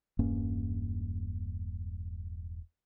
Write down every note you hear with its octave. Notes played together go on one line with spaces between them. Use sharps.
E1 G2 A#3 C#4